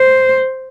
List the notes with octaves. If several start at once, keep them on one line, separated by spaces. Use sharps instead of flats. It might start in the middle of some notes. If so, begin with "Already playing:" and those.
Already playing: C5